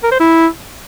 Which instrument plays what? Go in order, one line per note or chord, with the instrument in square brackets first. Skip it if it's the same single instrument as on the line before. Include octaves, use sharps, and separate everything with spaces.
[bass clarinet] A#4
C5
E4